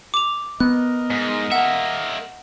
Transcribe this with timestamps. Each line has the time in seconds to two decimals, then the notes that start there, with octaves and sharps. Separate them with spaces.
0.14 D6 F7
0.60 B3 A#4 D#5 F#6
1.11 G#2
1.52 A#3 E5 F#5